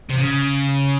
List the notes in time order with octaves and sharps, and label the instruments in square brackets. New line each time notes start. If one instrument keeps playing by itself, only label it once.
[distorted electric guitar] C3
C#3